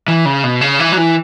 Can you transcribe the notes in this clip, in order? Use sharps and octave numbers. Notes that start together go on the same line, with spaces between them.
E3
C#3
B2
C#3
E3
F#3
E3